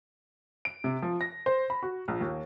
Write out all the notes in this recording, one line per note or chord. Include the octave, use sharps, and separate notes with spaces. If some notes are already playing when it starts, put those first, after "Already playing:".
D7
C3
F3
A#6
C5
B5
F#4
A#1
D#2